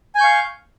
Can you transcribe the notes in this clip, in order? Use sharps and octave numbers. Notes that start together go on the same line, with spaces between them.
F5 G#5 C#6 G6